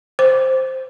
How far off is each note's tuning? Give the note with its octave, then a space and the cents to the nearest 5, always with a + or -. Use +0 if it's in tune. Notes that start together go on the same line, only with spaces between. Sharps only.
C5 +0